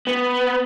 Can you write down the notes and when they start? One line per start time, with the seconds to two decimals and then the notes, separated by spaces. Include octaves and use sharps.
0.07 B3